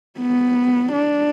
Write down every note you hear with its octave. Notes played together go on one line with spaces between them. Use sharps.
B3
D4